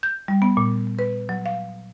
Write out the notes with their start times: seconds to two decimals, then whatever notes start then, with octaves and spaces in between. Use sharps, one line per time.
0.03 G6
0.28 G3
0.42 B3
0.57 A#2
0.99 B4
1.29 F#3
1.46 F5